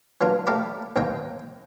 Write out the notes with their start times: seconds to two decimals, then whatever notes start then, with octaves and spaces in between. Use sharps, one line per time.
0.21 E3 F#3 A#3 D4 F4
0.47 A3 A#3 G4 A#4 D5 B5
0.96 A1 D#2 G#2 A#3 G5